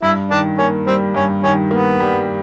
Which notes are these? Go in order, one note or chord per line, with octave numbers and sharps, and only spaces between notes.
G2 E4
D#3 D4
A#3 C#4
G3 C4
G2 C#4
D#3 C#4
A#3 B3
G3